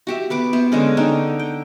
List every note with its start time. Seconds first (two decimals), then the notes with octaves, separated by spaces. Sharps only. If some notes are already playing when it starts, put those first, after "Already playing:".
0.07 F#4 G4 E5
0.30 B3 B4 D6
0.53 B3 C5 E5
0.72 D3 G#3 C#4
0.97 D3 D4 D#4 G5
1.39 G5